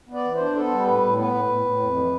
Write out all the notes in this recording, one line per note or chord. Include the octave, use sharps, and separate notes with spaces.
B3 D5
E3
D4 C5
B3 A4
G3
A2 B4
A2
B3 B4
A2
A2
A2
F2
E3